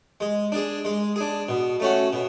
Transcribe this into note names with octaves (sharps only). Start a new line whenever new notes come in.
G#3
D4 G#4
G#3
D4 G#4
B2
A3 C#4 F#4
B2